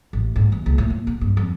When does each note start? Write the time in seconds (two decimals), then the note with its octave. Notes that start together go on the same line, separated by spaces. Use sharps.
0.13 A1
0.36 G#2
0.52 D#2
0.66 C#2
0.78 A2
0.90 A#2
1.07 A#2
1.21 G2
1.37 F2